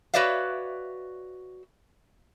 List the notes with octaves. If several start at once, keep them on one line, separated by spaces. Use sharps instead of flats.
F#4 B4 C#5 D5 E5 F5